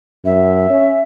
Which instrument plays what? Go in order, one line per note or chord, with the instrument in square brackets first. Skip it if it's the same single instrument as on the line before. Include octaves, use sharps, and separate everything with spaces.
[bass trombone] F#2 [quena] E5
[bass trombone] C#4